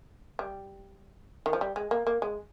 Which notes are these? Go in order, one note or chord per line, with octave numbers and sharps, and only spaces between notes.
G3
D#3
F3
G3
G#3
A#3
A#3
G#3